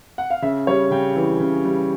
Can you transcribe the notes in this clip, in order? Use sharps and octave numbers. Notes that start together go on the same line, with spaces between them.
F#5
F5
C#3 E5
G3 C#5
C#3 G5
E3
C#3
G3